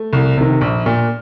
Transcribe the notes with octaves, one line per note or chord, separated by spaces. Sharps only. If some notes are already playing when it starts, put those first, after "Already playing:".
Already playing: A3
C2
C3 D#3
A#1
A#2